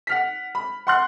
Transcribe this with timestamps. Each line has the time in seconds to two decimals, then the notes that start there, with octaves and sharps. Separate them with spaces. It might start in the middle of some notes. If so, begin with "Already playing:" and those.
0.07 F#5 F6 B6
0.55 B5
0.87 F#5 C6 F#6